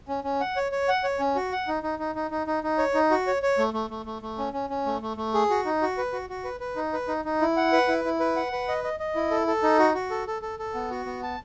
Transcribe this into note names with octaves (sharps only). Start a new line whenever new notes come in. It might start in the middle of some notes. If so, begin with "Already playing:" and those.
C#4
C#4
F#5
C#5
C#5
F#5
C#5
C#4
F#4
F#5
D#4
D#4
D#4
D#4
D#4
D#4
D#4
C#5
D#4
F#4
C#5
C#5
A3
A3
A3
A3
A3
C#4
C#4
C#4
A3
A3
A3
G#4
F#4
D#4
F#4
B4
F#4
F#4
B4
B4
D#4
B4
D#4
D#4
E4
F#5
B4
E4
E4
B4
F#5
B4
D#5
D#5
D#5
E4
A4
A4
D#4
F#4
F#4
A4
A4
A4
A4
B3
F#4
B3
A5